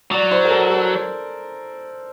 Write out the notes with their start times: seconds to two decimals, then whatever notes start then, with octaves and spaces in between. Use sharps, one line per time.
0.11 F#3 D5
0.31 C5
0.45 A#4
0.50 A4
0.70 A4